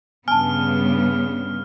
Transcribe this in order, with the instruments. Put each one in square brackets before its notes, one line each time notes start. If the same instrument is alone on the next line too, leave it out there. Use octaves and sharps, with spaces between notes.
[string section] G2 C#3 [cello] B3 [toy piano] G#5 A5 [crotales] F6